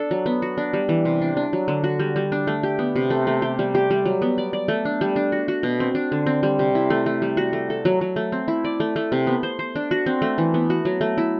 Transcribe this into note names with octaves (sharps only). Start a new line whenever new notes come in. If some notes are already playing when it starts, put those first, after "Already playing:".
Already playing: D4 A4
F#3
B3
F#4
D4
G3
E3
C3
D4
D4
F#3
D3
F#4
G3
G3
D4
A3
G4
B3
C3
A3
A3
G4
G3
G4
G3
F#3
B3
D5
D5
A3
D4
G3
D4
F#4
F#4
B2
C4
D4
D3
C4
G3
C3
E4
A3
A3
G3
F#4
A3
A4
F#3
F#3
A3
C4
E4
D5
A3
A3
C3
B3
C5
C5
D4
F#4
C4
A3
E3
B3
F#4
F#3
A3
E4